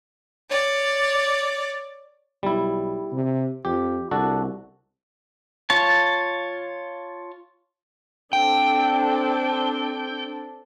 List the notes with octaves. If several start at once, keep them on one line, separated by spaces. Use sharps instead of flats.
C#5 D5
B1 G3 E4
C3
F2 G4
C2 D4 F#4 A4
F4 C#5 A5
C4 D4 A4 G5